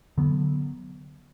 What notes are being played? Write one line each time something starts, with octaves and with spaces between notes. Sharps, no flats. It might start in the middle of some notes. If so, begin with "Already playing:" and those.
D3 F#3 B3